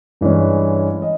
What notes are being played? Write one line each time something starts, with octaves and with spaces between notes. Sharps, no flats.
G2 E3 G#3 C#4
D#5